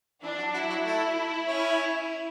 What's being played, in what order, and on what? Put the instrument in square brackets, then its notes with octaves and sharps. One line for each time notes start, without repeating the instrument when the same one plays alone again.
[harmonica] E3 E4 [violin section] D4
[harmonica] F#3 F#4
[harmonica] F#3 F#4 [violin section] E4
[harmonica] F#3 F#4
[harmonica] A3 A4 [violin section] E4
[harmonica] C#4 C#5